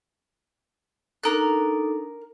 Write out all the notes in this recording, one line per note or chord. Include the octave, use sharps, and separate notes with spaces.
D4 D#4 A4 A#4 F#6